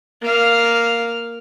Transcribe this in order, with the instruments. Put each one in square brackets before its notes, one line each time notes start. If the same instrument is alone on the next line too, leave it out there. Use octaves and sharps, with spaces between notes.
[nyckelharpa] A#3 F5